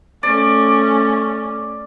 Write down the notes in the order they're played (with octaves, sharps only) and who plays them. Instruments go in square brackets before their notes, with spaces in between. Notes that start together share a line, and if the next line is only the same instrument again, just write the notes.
[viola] A3 C#4 [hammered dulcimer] D5